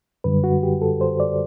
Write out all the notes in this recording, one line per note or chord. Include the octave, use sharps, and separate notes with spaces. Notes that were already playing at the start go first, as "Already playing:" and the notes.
F#2 D3 G3 B4
F#4
G4
A4
C5
D5